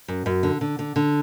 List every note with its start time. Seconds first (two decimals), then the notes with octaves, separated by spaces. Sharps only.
0.08 F#2
0.26 F#2
0.43 D3
0.61 D3
0.79 D3
0.96 D3